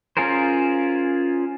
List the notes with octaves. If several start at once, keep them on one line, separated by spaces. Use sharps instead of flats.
C#4 F4 G#4 A#4 C5